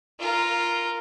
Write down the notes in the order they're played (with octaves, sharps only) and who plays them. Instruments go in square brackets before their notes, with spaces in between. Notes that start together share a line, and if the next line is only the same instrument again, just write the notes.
[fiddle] F4 A#4